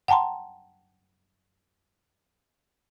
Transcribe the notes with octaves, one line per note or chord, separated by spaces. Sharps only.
F#5 G5 A5 A#5 C6